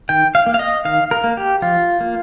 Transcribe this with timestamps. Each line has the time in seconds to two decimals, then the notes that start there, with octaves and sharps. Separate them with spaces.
0.09 D#3 G5
0.35 F5
0.46 A#3
0.54 F5
0.59 D#5
0.85 D#3 F5
1.11 A#4
1.24 A#3
1.37 G4
1.62 F3 F4
2.01 A#3